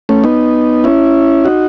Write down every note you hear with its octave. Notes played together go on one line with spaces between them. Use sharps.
A3 C#4
B3 D#4
C#4 E4
D#4 F#4